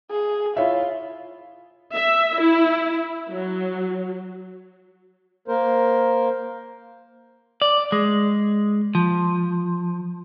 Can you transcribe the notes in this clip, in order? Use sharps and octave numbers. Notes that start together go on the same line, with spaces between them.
G#4
E4 F4 C#5 E5
E5
E4
F#3
A#3 A#4 C5
D5
G#3
F3